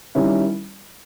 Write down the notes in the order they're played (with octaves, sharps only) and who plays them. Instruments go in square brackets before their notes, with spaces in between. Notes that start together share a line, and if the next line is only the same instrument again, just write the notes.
[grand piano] D#3 G3 C#4 E4